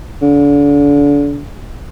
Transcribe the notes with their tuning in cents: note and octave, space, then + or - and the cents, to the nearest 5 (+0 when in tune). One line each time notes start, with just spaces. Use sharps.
D3 -35